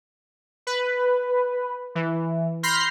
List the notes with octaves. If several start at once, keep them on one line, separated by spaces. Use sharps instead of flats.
B4
E3
B5 C6 F6 G6 A#6 C7